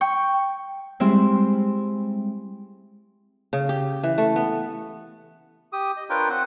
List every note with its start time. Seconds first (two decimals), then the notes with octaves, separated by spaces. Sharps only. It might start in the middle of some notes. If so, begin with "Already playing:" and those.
0.01 G5 C#6
1.00 G3 G#3 C4 E4
3.53 C#3
3.69 G4
4.03 E3
4.18 A3
4.36 B3
5.73 G4 D#6
5.97 D#5
6.10 D4 F4 A#4 B4 C#5 G5
6.29 C4 F#5